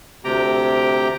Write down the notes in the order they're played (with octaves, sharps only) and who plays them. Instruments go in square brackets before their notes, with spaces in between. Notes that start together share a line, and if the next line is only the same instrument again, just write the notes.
[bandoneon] D2 C3 G4 G5 A#5